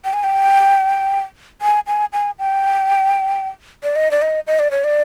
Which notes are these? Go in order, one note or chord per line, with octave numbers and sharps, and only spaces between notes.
G5
G#5
G5
G#5
G#5
G#5
G5
D5
D#5
D5
D#5
D#5
D5
C#5
D5